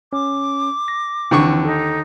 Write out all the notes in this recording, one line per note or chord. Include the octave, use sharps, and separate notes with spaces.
C#4 D6
A#6
D#2 D3 E3 C4 D#4 C#6
D#4 A4